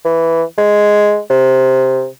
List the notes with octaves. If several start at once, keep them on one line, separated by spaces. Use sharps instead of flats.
E3
G#3
C3